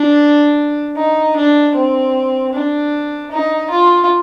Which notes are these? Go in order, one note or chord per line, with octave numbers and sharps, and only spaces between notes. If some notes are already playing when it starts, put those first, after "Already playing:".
Already playing: D4
D#4
D4
C4
D4
D#4
F4